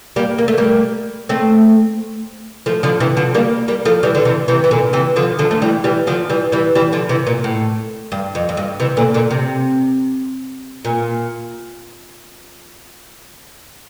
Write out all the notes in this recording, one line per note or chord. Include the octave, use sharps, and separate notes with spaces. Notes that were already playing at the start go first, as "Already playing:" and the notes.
G3 A#3
A#3
A3
G3 A#3
A3 C4
F3 A3
D3 F3
C3 E3
D3 F3
G3 A#3
G3 A#3
F3 A3
E3 G3
D3
C3 E3
C3 E3
E3
A#2 D3
C3 E3
D3 F3
D3 F3
A3
E3 G3
E3 G3
D3 F3
E3 G3
E3 G3
E3 G3
D3 F3
C3 E3
A#2
A2
G2
F2
F2
G2
C3 E3
A#2 D3
A#2 D3
C3
A#2